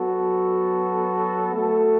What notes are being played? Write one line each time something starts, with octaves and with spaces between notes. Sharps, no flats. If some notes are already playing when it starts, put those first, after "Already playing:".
Already playing: F#3 B3 F#4 A4
A3 F#4 A4